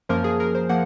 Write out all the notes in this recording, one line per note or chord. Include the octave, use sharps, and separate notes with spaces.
F#2 F3 A#3 A#4
G#4
A#4
C5
F3 A#3 F#5